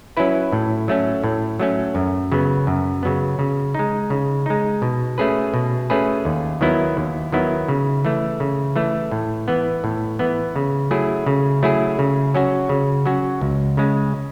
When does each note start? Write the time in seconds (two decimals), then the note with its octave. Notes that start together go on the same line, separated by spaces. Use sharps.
0.17 F#3 C#4 E4 B4
0.53 A2
0.88 F#3 A3 C#4
1.24 A2
1.60 F#3 A3 C#4
1.95 F#2
2.32 C#3 F#3 B3
2.67 F#2
3.03 C#3 F#3 B3
3.39 C#3
3.75 G#3 D#4
4.10 C#3
4.46 G#3 D#4
4.82 B2
5.18 A3 C#4 G#4 B4
5.54 B2
5.90 A3 C#4 G#4 B4
6.25 D#2
6.61 D#3 F#3 B3 E4
6.97 D#2
7.32 D#3 F#3 B3 E4
7.68 C#3
8.05 E3 A3
8.40 C#3
8.76 E3 A3
9.11 A2
9.48 E3 B3
9.84 A2
10.19 E3 B3
10.56 C#3
10.91 F#3 A3 E4 G#4
11.27 C#3
11.63 F#3 A3 E4 G#4
11.99 C#3
12.35 F#3 C#4 F#4
12.69 C#3
13.06 F#3 C#4 F#4
13.41 C#2
13.77 C#3 G#3